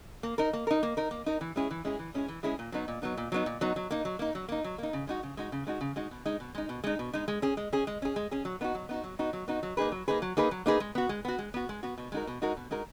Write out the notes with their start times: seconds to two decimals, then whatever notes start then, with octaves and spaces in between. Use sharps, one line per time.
0.23 A#3
0.38 D#4 A#4
0.53 A#3
0.67 D#4 A#4
0.83 A#3
0.97 D#4 A#4
1.11 A#3
1.26 D#4 A#4
1.41 E3
1.56 G#3 C#4 E4 G#4
1.71 E3
1.85 G#3 C#4 E4 G#4
1.99 E3
2.14 G#3 C#4 E4 G#4
2.28 E3
2.43 G#3 C#4 E4 G#4
2.59 A#2
2.72 F#3 B3 D#4
2.88 A#2
3.02 F#3 B3 D#4
3.17 A#2
3.32 F#3 B3 D#4
3.46 A#2
3.61 F#3 B3 D#4
3.76 F#3
3.91 A#3 D#4
4.05 F#3
4.19 A#3 D#4
4.35 F#3
4.49 A#3 D#4
4.64 F#3
4.78 A#3 D#4
4.93 C#3
5.07 G#3 D#4 F#4
5.23 C#3
5.37 G#3 D#4 F#4
5.52 C#3
5.67 G#3 D#4 F#4
5.81 C#3
5.96 G#3 D#4 F#4
6.11 B2
6.25 G#3 D#4
6.40 B2
6.55 G#3 D#4
6.69 B2
6.84 G#3 D#4
6.99 B2
7.13 G#3 D#4
7.28 G#3
7.42 C#4 G#4
7.57 G#3
7.73 C#4 G#4
7.87 G#3
8.02 C#4 G#4
8.16 G#3
8.31 C#4 G#4
8.45 F#3
8.61 B3 D#4 F#4
8.75 F#3
8.89 B3 D#4 F#4
9.04 F#3
9.19 B3 D#4 F#4
9.33 F#3
9.48 B3 D#4 F#4
9.63 F#3
9.77 A#3 D#4 G#4 B4
9.92 F#3
10.08 A#3 D#4 G#4 B4
10.22 F#3
10.37 A#3 D#4 G#4 B4
10.51 F#3
10.66 A#3 D#4 G#4 B4
10.80 G#3
10.95 B3 F#4
11.09 G#3
11.25 B3 F#4
11.39 G#3
11.54 B3 F#4
11.69 G#3
11.83 B3 F#4
11.98 B2
12.12 G#3 D#4 F#4 A#4
12.27 B2
12.42 G#3 D#4 F#4 A#4
12.57 B2
12.71 G#3 D#4 F#4 A#4